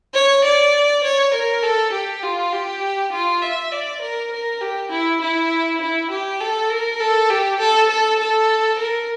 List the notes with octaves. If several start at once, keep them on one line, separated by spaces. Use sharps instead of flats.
C#5
D5
C#5
A#4
A4
G4
F4
G4
F4
E5
D5
A#4
A#4
G4
E4
E4
E4
G4
A4
A#4
A4
G4
A4
A4
A4
A#4